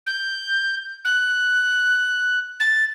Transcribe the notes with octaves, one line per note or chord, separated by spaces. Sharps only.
G6
F#6
A6